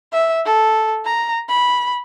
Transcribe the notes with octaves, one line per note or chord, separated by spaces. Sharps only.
E5
A4
A#5
B5